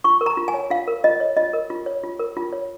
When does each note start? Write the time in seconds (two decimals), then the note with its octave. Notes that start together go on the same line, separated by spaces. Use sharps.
0.04 F4 C#6
0.21 A#4
0.26 A#5
0.37 F4
0.48 G#5
0.54 C#5
0.71 F4 F5
0.88 A#4
1.04 F4 D#5
1.20 C#5
1.37 F4 D#5
1.53 A#4
1.70 F4
1.86 C#5
2.04 F4
2.19 A#4
2.37 F4
2.53 C#5